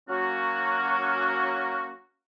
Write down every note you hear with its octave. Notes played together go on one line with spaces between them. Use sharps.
F#3 A#3 C#4 F#4